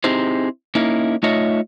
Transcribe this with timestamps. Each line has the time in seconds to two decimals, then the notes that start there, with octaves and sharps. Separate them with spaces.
0.04 C4 D#4 E4 G4 G#4 C5
0.75 A#3 C#4 D#4 E4
1.23 A3 D#4 F4 C#5 D#5 E5